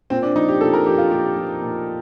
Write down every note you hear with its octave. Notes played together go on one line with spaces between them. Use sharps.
A#2 C4
D4
F3 D#4
G4
A#2 A4
A#4
F3 G4
F4
A#2 G4
F3
A#2